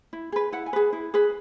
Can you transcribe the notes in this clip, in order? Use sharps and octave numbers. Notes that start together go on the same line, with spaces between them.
E4
G#4 B4
E4 F#5
G#5
G#4 B4
E4
G#4 B4